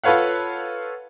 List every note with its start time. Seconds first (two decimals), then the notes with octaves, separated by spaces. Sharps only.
0.04 F4 A4 B4 C#5 F5 F#5